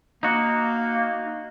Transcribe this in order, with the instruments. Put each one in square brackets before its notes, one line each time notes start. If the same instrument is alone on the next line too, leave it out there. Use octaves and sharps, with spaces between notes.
[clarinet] A#3 [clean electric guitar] D#4 F#4